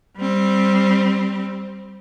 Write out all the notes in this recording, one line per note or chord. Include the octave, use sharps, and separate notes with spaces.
G3 C4